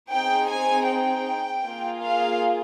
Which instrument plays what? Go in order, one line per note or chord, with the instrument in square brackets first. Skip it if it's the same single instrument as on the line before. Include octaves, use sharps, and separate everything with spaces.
[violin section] C4 D#4 G#4 G5
G#5
G5
A#3 F4 G#4
F5